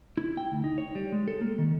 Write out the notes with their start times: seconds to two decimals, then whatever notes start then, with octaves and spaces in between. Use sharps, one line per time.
0.17 E4
0.37 G5
0.52 D2
0.64 D#4
0.78 C#5
0.95 G3
1.12 G#3
1.28 A4
1.41 A#3
1.58 D#3